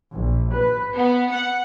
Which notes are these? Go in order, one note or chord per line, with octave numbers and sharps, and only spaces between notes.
A#1
B4
B3
F#5